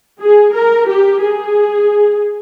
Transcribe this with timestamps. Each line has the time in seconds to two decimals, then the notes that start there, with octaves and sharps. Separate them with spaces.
0.21 G#4
0.54 A#4
0.88 G4
1.21 G#4